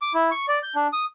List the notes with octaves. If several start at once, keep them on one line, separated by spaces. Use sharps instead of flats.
D6
E4
C#6
D5
G6
D4
D#6